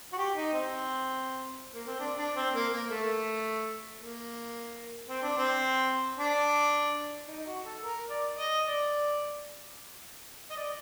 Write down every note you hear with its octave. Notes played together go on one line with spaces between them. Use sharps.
F#4
G4
D#4
C4
A#3
C4
D4
D4
C4
A#3
A#3
A3
A#3
C4
D4
C4
D4
D#4
D#4
F#4
A4
A#4
D5
D#5
D5
D#5
D5